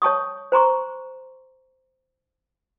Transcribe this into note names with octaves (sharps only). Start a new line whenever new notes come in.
C#5 A5 C#6 D#6
C5 A#5 C6 C#6